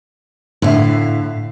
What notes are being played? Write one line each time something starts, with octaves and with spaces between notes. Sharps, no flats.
A2 D3 E5 F5